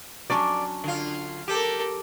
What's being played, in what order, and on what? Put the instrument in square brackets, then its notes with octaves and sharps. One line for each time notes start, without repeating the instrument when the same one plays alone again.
[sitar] F2 D5 [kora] F#3 C#4 D4
[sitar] D3 F4
[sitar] G4 [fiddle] A4 A#4